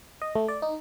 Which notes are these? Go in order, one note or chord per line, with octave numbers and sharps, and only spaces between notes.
D#5
A3
D5
D#4